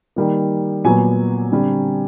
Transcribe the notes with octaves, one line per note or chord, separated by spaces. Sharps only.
D#3 G3 A#3
A#2 F#3 B3 G#5
D3 G3 C4